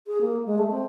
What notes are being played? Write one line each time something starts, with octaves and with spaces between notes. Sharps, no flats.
G#4
A#3
G#3
A3
C4